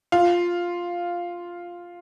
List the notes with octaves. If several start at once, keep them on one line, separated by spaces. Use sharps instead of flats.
F4